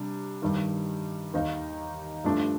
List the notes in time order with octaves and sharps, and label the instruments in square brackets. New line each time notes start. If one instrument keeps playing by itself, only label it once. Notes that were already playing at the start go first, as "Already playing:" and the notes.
Already playing: [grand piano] C3 G3 D4
G2 D#3 G3
D#2 D#3 A#3 D#4
G2 F3 A3 D4